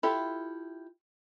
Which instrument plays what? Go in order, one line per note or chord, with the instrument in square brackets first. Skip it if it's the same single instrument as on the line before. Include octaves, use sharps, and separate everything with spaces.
[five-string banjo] E4 F4 G4 A4 E5